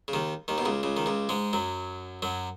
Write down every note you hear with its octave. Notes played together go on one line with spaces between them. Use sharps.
C#3
D#2 D#3
D#2 D#3
B2
C#2 C#3
C#2 C#3
D#3
C#2 C#3
G#2 G#3
F#2 F#3
F#2 F#3